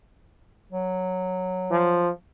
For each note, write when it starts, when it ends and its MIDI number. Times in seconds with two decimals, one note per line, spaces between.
0.72 2.21 54
1.71 2.10 53